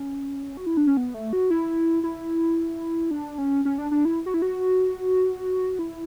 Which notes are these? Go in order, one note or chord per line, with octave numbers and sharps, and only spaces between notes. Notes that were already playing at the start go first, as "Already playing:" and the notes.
Already playing: C#4
F#4
E4
D4
C#4
B3
A3
F#4
E4
E4
D4
C#4
C#4
D4
D4
E4
F#4
E4
F#4
E4